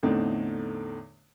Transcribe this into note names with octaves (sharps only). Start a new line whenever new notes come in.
E2 A2 D3 A3 C4 D#4